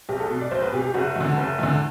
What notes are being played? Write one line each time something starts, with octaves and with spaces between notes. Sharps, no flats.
B1 G4
A4
B2
D5
B1 C5
B4
B2 G4
G4
F#1 F#4
E2 D3
F#1
E2 D3